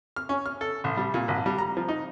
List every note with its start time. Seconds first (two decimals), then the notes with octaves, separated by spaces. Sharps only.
0.16 F6
0.29 C#4
0.46 F6
0.61 A4
0.84 A1
0.97 G3
1.14 A#2
1.28 G#1
1.46 G3
1.58 A#5
1.77 F3
1.88 D#4